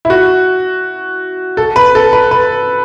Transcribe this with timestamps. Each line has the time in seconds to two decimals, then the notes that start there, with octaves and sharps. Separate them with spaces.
0.05 E4
0.10 F#4
1.57 A4
1.76 B4
1.95 A4
2.13 B4
2.31 B4